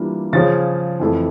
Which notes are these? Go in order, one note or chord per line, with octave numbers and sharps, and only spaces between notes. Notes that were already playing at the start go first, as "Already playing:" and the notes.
Already playing: E3 G3 A#3 D4 F4
C#3 F3 C#4 A6
F2 E3 A3